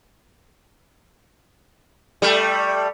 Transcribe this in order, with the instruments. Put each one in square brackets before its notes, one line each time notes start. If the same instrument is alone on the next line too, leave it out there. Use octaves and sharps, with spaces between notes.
[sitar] G3 A3